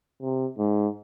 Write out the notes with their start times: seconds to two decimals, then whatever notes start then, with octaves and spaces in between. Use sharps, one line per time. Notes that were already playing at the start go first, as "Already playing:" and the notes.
0.22 C3
0.58 G#2